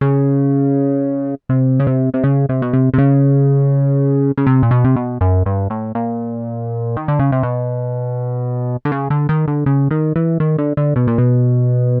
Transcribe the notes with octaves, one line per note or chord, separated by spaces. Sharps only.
C#3
C3
C#3
C3
C3
C#3
C3
B2
C3
C3
C#3
C#3
C3
A#2
B2
C3
B2
F#2
G2
A2
A#2
D#3
D3
C#3
C3
B2
D3
C#3
D3
D#3
D3
C#3
D#3
E3
D#3
D3
D3
B2
A#2
B2